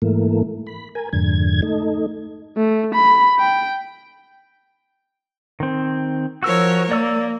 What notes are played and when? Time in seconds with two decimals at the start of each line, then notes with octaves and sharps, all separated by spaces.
0.02 G#2 E3 A3 A#3
0.67 B5
0.95 A#4 G#5
1.13 F2 G#2 D3 G#6
1.62 A3 D#4
2.57 A3
2.95 B5
3.39 G5
5.60 D#3 C4
6.43 F3 F#4 A#4 C#5 E6
6.91 A#3 D5 E6